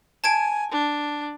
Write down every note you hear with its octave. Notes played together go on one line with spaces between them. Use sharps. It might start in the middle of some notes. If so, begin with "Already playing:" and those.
G#5 A5 G#6 D7
D4